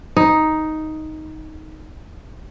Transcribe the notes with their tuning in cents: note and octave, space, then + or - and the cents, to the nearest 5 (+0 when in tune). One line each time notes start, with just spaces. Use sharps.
D#4 +5